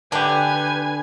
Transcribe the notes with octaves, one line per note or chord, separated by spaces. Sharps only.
D3 D4 G4 B4 G#5